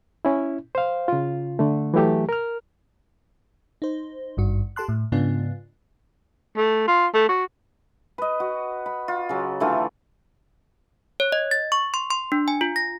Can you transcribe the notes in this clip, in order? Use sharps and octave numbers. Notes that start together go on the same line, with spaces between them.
C#4 E4
C5 F5
C#3 F4
D3 A3
E3 F#3 A3 G4
A#4 F6
D#4 C5
G#1 G2 F#4
G4 A4 A5 C6 F#6
A2
G#2 C#3 B3 D4 F4
A3
F4
A3
F#4
B4 D#5
F#4
B5
F4
C#3 F#3
D3 E3 A3 F4
C#5
D#5
A6
C#6
C6
C6
D4
G#5
F4
A#6